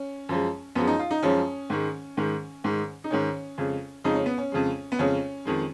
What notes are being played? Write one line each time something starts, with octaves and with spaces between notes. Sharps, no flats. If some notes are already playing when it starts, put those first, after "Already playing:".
Already playing: C#4
F#2 F3 G#3
F#2 F3 G#3 B3
D#4
F4
D#4
F#2 F3 G#3 C#4
G#2 D#3 G#3
G#2 D#3 G#3
G#2 D#3 G#3
D#4
G#2 D#3 G#3 C#4
F2 C#3 G#3
F2 C#3 G#3 D#4
C#4
B3
C#4
F2 C#3 G#3
B3
F2 C#3 G#3 C#4
F2 D#3 G#3